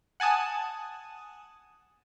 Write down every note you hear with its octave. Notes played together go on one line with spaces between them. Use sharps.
F#5 G#5 A5 D#6